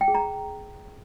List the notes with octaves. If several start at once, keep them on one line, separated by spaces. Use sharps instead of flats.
G5
G#4
A#5